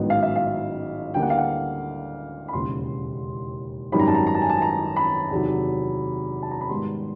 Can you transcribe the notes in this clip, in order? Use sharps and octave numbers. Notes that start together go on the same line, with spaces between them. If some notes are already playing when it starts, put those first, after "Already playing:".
Already playing: A1 G#2 D#3 F#3 B3
F5
E5
F5
D2 D3 G3 A#3 G5
F#5
F5
F#5
B5
E1 D#2 C#3 C6
G#1 F#2 D#3 G3 B5
A#5
A5
A#5
A#5
A5
G#5
A5
A#5
B5
E2 C3 D#3 F#3
A5
A#5
B5
G#2 D#3 G3 B3 C6